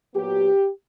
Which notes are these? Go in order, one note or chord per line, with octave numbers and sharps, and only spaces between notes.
A#2 F#3 B3 G4